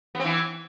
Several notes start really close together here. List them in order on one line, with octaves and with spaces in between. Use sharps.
B3 C4 E3